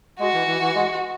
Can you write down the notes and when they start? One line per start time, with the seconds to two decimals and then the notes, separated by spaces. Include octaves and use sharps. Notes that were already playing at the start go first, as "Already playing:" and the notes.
0.20 G#3 F#4
0.33 E3
0.48 E3
0.61 E3
0.75 G#3